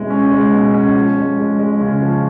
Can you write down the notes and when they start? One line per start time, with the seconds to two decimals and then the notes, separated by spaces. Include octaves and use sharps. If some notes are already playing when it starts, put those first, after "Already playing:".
Already playing: B2 G#3 C#4 E4
0.10 C#4
0.31 G#3
0.52 B2
0.74 C#4
0.95 F3
1.17 G#3
1.38 G#3
1.59 G#3
1.81 C#3
2.01 F3